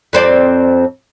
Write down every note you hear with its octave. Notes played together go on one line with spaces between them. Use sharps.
F2 C4 D5